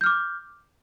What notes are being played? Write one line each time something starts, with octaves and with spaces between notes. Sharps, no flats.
D6 F6 G6